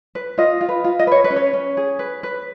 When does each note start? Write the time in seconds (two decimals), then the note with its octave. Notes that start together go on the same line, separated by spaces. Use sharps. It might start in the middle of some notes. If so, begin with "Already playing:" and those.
0.15 B4
0.38 F4 D#5
0.61 F4
0.69 B4
0.84 F4
0.99 D#5
1.07 B4 C#5
1.24 B4
1.30 C#4
1.36 C#5
1.53 C#4
1.77 G#4
1.99 B4
2.23 B4